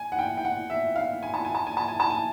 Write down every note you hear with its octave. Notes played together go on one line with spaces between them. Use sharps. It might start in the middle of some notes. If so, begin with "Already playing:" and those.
Already playing: G#5
F#5
G5
G5
F#5
E5
F5
G#5
A5
G#5
A5
G#5
A5
G#5
A5
G#5